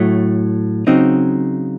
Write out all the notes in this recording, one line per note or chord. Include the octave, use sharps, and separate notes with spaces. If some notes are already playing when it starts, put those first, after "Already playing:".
Already playing: A2 F#3 A3
C#3 F#3 C4 D#4